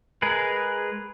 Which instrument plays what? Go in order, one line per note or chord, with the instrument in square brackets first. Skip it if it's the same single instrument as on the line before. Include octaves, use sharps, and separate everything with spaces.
[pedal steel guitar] G#3 G#4 A#4 B4